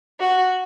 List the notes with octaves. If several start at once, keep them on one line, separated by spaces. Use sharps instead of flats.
F#4